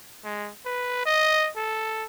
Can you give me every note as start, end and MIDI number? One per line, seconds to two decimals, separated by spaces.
0.24 0.50 56
0.66 1.03 71
1.05 1.49 75
1.57 2.06 69